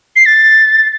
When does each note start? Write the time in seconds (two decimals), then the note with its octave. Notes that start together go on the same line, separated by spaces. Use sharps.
0.16 C7
0.26 A6